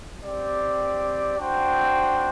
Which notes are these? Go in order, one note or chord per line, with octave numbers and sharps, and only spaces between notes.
C4 G4 D5
D4 F#4 C5 G5